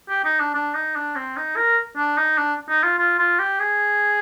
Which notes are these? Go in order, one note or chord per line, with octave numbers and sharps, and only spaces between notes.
G4
D#4
D4
D4
D#4
D4
C4
D#4
A#4
D4
D#4
D4
D#4
F4
F4
F4
G4
G#4